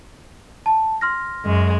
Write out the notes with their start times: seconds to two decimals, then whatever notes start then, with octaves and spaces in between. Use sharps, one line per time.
0.66 A5
1.01 C6 F6 A#6
1.44 F#2 G#3